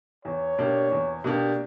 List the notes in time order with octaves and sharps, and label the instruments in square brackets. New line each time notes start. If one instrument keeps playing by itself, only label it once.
[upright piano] E2 [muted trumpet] C#5
[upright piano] B2 A#3 D4 G4
E2
B2 A#3 D4 G4